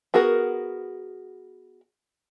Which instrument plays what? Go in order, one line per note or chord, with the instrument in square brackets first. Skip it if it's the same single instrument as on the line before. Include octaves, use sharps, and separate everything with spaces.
[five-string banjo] B3 F#4 G#4 A#4